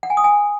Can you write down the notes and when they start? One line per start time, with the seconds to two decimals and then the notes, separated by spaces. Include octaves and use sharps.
0.03 F#5
0.10 G#5
0.17 D#6
0.24 G#5